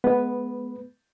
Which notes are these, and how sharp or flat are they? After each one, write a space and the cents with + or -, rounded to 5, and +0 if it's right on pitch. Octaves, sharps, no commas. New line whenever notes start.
G#3 +35 B3 +0 B4 +0